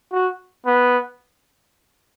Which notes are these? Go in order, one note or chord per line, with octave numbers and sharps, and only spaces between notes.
F#4
B3